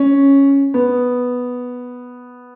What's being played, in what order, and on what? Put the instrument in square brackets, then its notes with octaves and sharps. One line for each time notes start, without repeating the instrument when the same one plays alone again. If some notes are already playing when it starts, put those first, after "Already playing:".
Already playing: [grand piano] C#4
B3